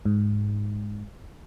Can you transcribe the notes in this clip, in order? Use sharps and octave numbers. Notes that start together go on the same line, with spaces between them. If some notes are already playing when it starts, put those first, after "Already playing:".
G#2